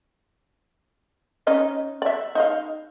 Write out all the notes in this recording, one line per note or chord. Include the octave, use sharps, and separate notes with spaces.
C#4 D#4 D#5
D5 E5
D#4 D#5 F5